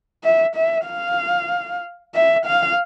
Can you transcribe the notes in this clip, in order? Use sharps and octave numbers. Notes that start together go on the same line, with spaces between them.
E5
E5
F5
E5
F5